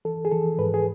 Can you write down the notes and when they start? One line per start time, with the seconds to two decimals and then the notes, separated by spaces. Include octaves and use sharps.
0.05 E3 A4
0.25 G#4
0.31 E3 A4
0.59 G#2 B4
0.74 G#4